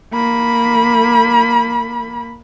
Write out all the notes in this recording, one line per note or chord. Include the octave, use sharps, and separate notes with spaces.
A#3 B5